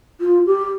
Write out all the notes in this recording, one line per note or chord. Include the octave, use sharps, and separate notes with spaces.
F4
G4